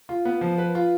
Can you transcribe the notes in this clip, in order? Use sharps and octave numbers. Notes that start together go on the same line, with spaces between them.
F4
B3
F3
B4
F4